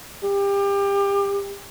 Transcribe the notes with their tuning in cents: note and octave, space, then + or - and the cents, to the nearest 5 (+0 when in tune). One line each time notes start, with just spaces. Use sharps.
G4 +30